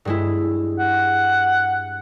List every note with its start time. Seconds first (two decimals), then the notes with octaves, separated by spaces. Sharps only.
0.05 G2 G#3 E4
0.79 F#5